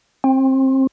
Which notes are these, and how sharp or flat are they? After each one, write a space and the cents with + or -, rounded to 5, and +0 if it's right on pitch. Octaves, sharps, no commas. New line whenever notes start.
C4 +25